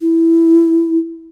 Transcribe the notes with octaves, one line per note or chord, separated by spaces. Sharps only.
E4